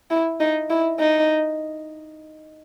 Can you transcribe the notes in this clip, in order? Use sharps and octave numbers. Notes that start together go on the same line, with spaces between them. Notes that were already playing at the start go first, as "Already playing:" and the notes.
E4
D#4
E4
D#4